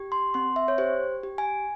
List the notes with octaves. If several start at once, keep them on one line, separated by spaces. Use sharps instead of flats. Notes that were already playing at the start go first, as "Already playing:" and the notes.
Already playing: G4
C6
C4 C6
E5
C#5
G4 C5
G4
G#5